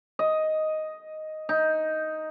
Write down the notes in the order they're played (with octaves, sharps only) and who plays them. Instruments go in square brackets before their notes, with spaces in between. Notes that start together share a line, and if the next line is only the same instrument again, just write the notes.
[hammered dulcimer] D#5
D#4